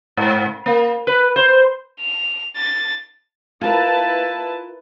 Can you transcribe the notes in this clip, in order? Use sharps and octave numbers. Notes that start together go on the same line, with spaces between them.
G#2
A#3
B4
C5
F7
A6
E4 F4 A#4 B4 A5